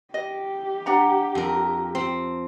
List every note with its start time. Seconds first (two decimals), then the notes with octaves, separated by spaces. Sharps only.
0.14 G4 D#5
0.86 D4 F#5 A#5
1.35 F2 A#4
1.95 C4